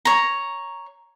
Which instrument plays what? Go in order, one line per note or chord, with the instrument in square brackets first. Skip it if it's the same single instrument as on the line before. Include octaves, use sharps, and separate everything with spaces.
[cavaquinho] C#5 A#5